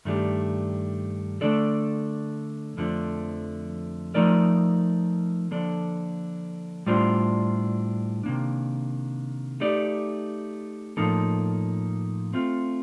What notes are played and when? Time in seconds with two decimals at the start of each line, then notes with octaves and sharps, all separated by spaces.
0.05 G2 D#3 A3 D4 G4
1.41 D3 A3 D4 A4 D5
2.77 F2 D3 F3 A3 D4
4.14 F3 A3 D#4 A#4 D5
5.51 D3 F3 A#3 D4 A4
6.86 A2 G3 D4 F4 C5
8.24 C3 D#3 A#3 D4
9.60 A3 D#4 G4 D5
10.97 A2 F3 A#3 D#4 A4
12.33 A3 C4 F4